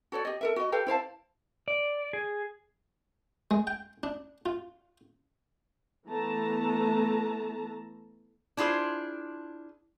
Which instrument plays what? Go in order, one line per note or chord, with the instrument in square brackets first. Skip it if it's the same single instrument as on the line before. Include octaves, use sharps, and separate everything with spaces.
[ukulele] F#4 A4 C#5 D5
G4 D#5
A4 A#4 E5
F#4 D#5
G4 A4 B4 F5
E4 C5 F5 A5
[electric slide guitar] D5
G#4
[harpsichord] G#3
G5
D4
F4
[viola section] E3 A3 B3 A5 A#5
[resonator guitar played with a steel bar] D4 E4 F4 G#4 C5